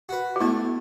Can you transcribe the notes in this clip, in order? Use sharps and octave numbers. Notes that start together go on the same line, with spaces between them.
F#4 B4
F#4
A3 B3 E4